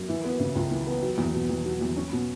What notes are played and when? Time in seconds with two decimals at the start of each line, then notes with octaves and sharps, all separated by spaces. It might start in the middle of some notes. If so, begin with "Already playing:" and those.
Already playing: F#2
0.09 E3
0.25 B3
0.40 C#3
0.55 C#2
0.71 E3
0.87 B3
1.02 F#3
1.18 E2
1.34 B2
1.50 E2
1.65 F#3
1.81 E2
1.96 C#4
2.12 B2